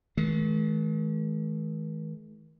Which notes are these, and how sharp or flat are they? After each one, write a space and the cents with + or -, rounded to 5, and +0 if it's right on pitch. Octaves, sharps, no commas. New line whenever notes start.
D#3 +45 G#3 +45